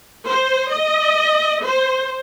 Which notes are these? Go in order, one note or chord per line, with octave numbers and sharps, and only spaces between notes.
C5
D#5
C5